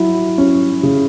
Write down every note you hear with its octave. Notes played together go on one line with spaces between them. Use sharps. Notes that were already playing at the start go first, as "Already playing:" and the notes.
Already playing: F#3 E4
C#4
C#3